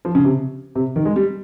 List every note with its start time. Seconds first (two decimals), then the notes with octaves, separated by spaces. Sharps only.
0.05 F3
0.15 C#3
0.25 C3
0.75 C3
0.96 D#3
1.05 G#3
1.16 G3